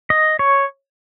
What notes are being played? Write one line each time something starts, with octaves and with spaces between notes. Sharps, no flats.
D#5
C#5